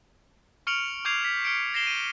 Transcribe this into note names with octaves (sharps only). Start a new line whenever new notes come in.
C#6 F6 C#7 D7 F7 F#7
C#6 D6 G6 G#6 C7 F7
B6
F6 C#7 D7
A#6 C7 E7 G7
D#7